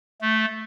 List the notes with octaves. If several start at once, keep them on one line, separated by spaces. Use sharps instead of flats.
A3